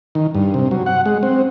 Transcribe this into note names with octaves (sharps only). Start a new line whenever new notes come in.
D#3
G2
C3
F#3
F#5
G#3
C4